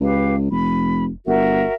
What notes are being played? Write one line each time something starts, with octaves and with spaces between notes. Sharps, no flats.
C#2 G4 B4 F5
F1 B5
G1 F#4 A#4 E5